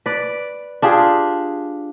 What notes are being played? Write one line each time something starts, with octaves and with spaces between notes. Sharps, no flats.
B4 D5
D4 F4 G4 G#4